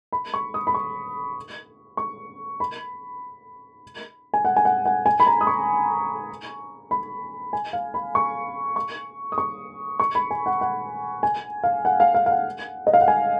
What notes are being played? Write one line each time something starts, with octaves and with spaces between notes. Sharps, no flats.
B5
C#6
D#6
B5
C#6
C#6
B5
G#5
F#5
G#5
F#5
F#5
G#5
B5
A#5
D#6
C#6
B5
G#5
F5
B5
C#6
C#6
D#6
C#6
C#6
B5
G#5
F#5
F#5
G#5
F5
F#5
F5
F5
F5
F#5
D#5
F5
F#5
G#5